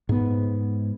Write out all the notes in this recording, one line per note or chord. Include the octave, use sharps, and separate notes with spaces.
G#2 B3